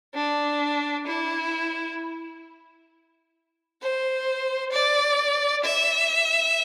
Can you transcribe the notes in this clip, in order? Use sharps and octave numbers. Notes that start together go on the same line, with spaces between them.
D4
E4
C5
D5
E5